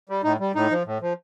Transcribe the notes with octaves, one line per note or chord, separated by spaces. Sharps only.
G3
A2 D#4
G3
A2 D#4
F3
A2
F3